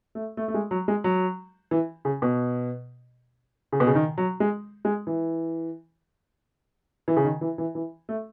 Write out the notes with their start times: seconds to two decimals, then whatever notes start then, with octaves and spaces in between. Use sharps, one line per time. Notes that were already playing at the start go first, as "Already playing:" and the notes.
0.15 A3
0.37 A3
0.48 A3
0.54 G#3
0.71 F#3
0.88 G#3
1.04 F#3
1.71 E3
2.05 C#3
2.22 B2
3.72 C#3
3.80 B2
3.87 C#3
3.95 D#3
4.18 F#3
4.40 G#3
4.85 G#3
5.07 E3
7.08 E3
7.17 C#3
7.24 D#3
7.41 E3
7.58 E3
7.75 E3
8.09 A3